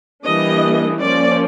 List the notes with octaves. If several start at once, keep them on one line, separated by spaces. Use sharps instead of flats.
E3 G3 A#3 D4 D#5
F3 A#3 C#4 D5